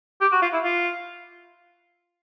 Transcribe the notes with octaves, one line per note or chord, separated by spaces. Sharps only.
G4
F#4
F4
E4
F4